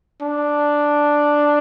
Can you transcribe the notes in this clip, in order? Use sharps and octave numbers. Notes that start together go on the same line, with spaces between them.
D4